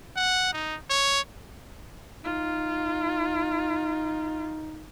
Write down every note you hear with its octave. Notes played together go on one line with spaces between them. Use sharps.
F#5
D#4
C#5
D#4 F4